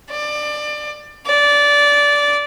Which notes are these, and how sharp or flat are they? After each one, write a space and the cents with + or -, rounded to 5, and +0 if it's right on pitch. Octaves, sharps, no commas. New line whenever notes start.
D5 +25
D5 -15